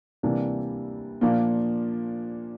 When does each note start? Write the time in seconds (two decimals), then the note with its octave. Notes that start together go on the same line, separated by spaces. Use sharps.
0.23 C3 E3 G3 A#3 D4
1.21 A#2 F3 A#3 D4 F4